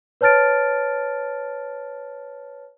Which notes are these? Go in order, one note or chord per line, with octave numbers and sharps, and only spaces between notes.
B4 C#5 A5 F6 A6 D7